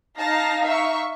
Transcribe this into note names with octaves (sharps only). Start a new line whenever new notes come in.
D#4 F5 A5 A#6
E5 C#6